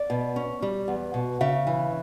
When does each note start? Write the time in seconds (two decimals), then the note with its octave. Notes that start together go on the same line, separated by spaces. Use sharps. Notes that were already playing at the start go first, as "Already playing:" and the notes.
Already playing: D5
0.10 B2
0.36 C#4
0.62 G3
0.88 E2
1.14 B2
1.41 C#3 E5
1.67 E3